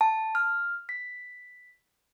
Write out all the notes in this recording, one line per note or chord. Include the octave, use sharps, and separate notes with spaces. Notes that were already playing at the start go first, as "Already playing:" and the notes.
A5
F6
B6